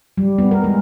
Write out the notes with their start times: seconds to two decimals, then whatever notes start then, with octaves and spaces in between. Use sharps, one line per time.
0.17 G3
0.38 B3
0.51 A#4
0.64 G#3